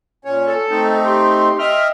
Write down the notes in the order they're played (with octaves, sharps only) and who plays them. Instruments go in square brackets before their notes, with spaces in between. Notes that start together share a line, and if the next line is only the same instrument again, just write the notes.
[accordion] A#2 C#4 C#5
[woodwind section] A4
[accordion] A3 C4 D#4
[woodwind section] G4 C6
[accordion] D#5 E5 [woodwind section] G5 C6 F6